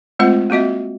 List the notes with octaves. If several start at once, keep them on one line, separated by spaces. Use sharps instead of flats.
G#3 A3 C4 F4 C5 F#5
A#3 C4 F#4 D#5 E5